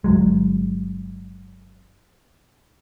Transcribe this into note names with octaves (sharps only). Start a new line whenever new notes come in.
G1 C2 F#3 G#3